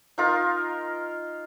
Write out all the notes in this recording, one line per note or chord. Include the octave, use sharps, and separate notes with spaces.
D#4 F4 A#4